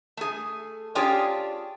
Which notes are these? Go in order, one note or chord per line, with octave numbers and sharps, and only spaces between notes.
A3 G#4
C#4 D4 F4 G4 G#4 C#5